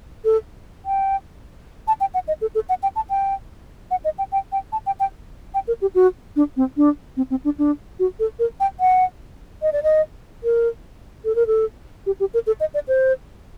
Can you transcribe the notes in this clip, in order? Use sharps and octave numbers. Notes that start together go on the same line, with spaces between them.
A4
G5
A5
G5
F#5
D#5
A4
A4
F#5
G5
A5
G5
F#5
D#5
G5
G5
G5
A5
G5
G5
G5
A#4
G4
F#4
D4
C4
D4
C4
C4
D4
D4
F#4
A4
A#4
G5
F#5
D#5
D5
D#5
A#4
A4
A#4
A4
G4
G4
A#4
A4
D#5
D5
C5